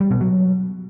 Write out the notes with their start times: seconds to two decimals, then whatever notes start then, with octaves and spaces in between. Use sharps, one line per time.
0.01 G3
0.11 B2
0.21 F#3